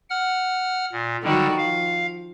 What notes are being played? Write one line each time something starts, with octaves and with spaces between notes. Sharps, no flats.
F#5 F6
A#2
D3 D#3 F#3 G3 F#4
F3 F5